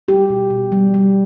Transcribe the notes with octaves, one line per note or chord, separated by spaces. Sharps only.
G3 G4
B2
B2
G3
G3